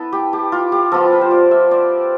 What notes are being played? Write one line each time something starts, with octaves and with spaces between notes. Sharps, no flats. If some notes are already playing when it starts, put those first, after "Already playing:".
Already playing: B3 E4 A4 B4
G4
G4
F4
G4
F3 B3 F4 A4
B4
C5
D5
E5
D5